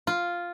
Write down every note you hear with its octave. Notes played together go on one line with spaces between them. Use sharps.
F4